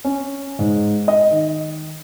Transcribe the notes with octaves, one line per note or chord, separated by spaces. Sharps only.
C#4
G#2
D#5
D#3